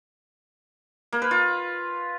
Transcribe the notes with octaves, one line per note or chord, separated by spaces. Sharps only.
A#3
B4
F4